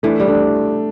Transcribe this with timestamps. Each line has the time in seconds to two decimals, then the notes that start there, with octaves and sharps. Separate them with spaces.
0.03 E3 A3 D4
0.20 G3
0.28 A3 D4